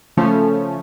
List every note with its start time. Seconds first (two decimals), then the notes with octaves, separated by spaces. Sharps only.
0.17 C#3 F3 A3 C#4